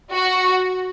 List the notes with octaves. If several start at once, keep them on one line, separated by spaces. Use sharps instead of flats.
F#4